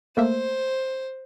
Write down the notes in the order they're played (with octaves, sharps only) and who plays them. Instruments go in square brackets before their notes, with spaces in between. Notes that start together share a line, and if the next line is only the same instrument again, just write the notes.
[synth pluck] A3 A#3 E5 [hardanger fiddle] C5